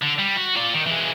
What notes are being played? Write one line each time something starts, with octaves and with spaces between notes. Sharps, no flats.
D3
G3
F#4
F4 D5
D#3
E3 G#3